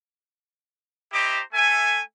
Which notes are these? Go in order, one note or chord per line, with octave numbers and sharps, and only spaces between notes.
E4 G4 C5 D#5 A#5 D6
A3 A4 E5 G#5